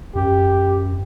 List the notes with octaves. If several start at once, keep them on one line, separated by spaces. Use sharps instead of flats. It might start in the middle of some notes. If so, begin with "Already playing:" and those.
F#2 G4